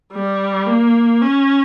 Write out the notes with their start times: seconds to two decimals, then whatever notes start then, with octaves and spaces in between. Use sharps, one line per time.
0.13 G3
0.67 A#3
1.22 C#4